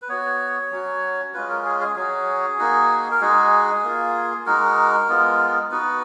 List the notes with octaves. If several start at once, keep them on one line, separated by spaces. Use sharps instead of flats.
B4
B3 F#4 C#5
F#3 C#4 F#4
G#3 C#4 F4 B4
A#4
G#4
G#4
F#3 C#4 F#4 G#4
A#3 D#4 F#4
A#4
G#3 D#4 F#4 G#4
A#3 F4
G#3 D#4 F#4 A#4
G#3 B3 F4
B3 D#4 F#4 B4